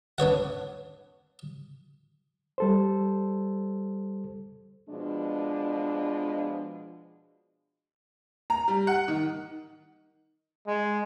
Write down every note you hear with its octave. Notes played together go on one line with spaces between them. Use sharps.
D4 B4 C#5 F#5
G3 A4 C5
B2 F3 G#3 D4
A#5
G3
F#5
D#3
G#3